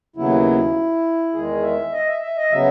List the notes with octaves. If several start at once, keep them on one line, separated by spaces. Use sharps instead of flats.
D#2 C#3 F#3 B3 E4
E2 D#3 G#3 G#4
E5
D#5
E5
E5
D#5
C#3 F#3 B3 E5